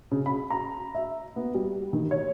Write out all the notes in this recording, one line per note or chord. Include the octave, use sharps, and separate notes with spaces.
C#3
B5
A#5
E5
B3
G3
D#3
C#5